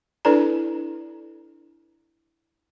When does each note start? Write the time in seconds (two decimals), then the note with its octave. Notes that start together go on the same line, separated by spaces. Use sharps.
0.25 D4 E4 A4 B4 D5 A#5